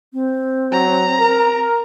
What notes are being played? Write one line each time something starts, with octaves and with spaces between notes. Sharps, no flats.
C4
F#3 A#5
A#4